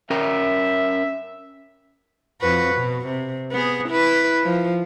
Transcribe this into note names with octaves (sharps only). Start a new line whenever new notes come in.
C#4 A#4 E5 G5
F2 F#4 B4
B2
C3
B3 G#4
E4 B4
F3